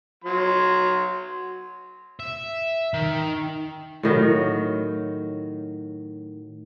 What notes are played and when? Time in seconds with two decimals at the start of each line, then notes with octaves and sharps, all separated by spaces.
0.24 F#3 C6
2.20 E5
2.94 D#3
4.03 A2 D#3 F#3